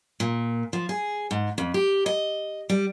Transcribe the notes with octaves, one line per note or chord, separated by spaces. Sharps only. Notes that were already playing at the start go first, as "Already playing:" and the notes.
A#2
F3
G#4
G#2
F2
G4
D#5
G3